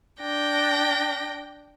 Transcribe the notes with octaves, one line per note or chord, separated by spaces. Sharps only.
D4 G5 A#6